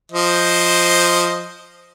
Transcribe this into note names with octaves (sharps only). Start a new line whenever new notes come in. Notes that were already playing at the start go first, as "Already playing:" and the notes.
F3 C5 D#5